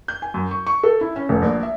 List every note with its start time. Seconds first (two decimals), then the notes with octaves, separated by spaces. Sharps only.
0.08 G6
0.22 G#5
0.34 F#2
0.51 C#6
0.67 C#6
0.83 A4
1.01 E4
1.16 C#4
1.29 F1
1.42 A#1
1.63 E5